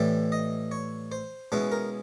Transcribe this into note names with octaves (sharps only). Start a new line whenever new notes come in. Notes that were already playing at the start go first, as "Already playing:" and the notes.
Already playing: A2 E3 G3 E5
D#5
C#5
C5
B2 G#3 C#4 E4 B4
A#4